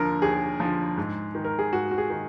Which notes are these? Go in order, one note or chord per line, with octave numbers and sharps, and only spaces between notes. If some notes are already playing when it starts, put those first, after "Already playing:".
Already playing: D#2 D3 F3 A#4
D#2 G#4
F3
D3
G#2
D#3
A#4
G#4
G#2 F#4
F#4
G#4
D#3